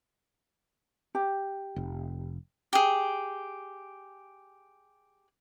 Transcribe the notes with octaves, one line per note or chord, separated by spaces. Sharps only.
G4
F1
G4 G#4